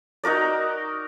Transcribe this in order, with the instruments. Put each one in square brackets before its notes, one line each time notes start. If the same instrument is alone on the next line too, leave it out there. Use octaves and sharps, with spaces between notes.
[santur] D#4 F#4 A#4 D5